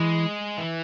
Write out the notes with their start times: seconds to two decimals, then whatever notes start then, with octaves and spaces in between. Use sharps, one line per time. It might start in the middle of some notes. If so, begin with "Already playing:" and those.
Already playing: E3 G#3
0.58 E3